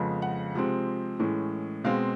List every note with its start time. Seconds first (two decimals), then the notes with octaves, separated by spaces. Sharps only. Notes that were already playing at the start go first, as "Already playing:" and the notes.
Already playing: F2 C#3 F3 G#3 B3
0.22 F#5
0.55 C3 F3 G#3 C4
1.19 A2 E3 G#3 C#4
1.84 B2 G#3 C4 F5